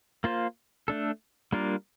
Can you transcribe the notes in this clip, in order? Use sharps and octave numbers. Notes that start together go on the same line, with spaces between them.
A#3 F4 C5
A3 D4 A4
G3 A#3 D4 F4 A#4